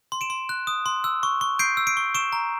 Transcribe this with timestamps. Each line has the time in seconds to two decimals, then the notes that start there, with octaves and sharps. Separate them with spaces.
0.12 C6
0.21 D7 E7
0.30 C6
0.49 F#6
0.67 D#6
0.86 C6
1.04 E6
1.23 C#6
1.41 C#6
1.59 G6 C7 D7
1.77 E6
1.87 C7 D7
1.97 C#6
2.15 C#6 D7 E7
2.33 A#5